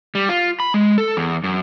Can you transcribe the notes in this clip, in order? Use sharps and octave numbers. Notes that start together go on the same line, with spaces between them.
G3
F4
B5
G#3
A4
E2
F#2